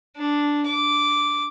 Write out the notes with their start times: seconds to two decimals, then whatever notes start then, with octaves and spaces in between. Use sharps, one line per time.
0.16 D4
0.65 D6